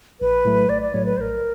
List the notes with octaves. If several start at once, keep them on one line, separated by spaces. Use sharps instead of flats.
A#1 B4
A2 F#3 A3
A#1 D5
D5
A2 F#3 A3 C#5
B4
A#1 A#4 C5